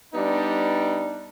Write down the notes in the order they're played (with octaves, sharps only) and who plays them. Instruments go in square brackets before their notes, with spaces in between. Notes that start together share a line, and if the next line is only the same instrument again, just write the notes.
[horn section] G3 B3 D4 D#4